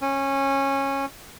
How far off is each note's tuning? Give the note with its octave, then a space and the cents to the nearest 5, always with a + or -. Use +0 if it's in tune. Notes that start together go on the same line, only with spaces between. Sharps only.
C#4 -20